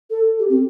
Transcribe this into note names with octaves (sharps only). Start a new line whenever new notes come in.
A4
G4
C4